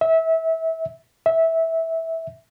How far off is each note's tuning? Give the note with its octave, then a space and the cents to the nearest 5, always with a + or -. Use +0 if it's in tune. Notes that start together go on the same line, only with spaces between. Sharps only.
E5 -25
E5 -15